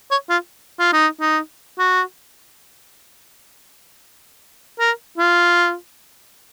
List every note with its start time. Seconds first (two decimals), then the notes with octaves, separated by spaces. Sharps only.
0.11 C#5
0.30 F4
0.79 F4
0.93 D#4
1.20 D#4
1.79 F#4
4.80 A#4
5.18 F4